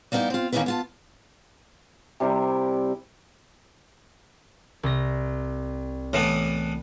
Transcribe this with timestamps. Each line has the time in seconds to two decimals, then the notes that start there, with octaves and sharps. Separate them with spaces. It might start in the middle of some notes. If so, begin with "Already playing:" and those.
0.12 G3 A#3 B3 C#4 D#4 E4
0.30 C4 F4
0.52 D#3 A#3 B3 C#4 E4 B4
0.66 B3 F4 A5
2.20 C3 G3 E4 A#4
4.83 C2 A#6
6.13 A2 E3 B3